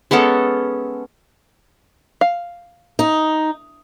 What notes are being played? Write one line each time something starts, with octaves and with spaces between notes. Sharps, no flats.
G#3 B3 C#4 A4
F5
D#4